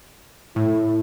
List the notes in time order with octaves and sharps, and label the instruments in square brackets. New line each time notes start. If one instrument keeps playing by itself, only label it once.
[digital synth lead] A2 [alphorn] E4